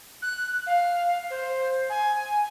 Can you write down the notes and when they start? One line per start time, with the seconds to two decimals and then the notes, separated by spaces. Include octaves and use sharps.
0.22 F#6
0.66 F5
1.30 C5
1.90 G#5